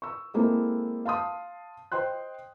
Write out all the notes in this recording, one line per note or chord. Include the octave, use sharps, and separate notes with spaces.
C#6 E6
G#3 A#3 C4 E4 A4 D#5
F5 A5 C6 D#6
C5 D#5 G5 C6 F#6